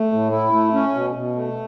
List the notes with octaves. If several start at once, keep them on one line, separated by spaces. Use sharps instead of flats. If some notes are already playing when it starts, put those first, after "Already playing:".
Already playing: A3
A2
E4
A3
C#4
B2
B2
A3